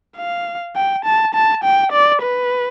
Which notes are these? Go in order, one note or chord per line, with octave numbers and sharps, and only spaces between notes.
F5
G5
A5
A5
G5
D5
B4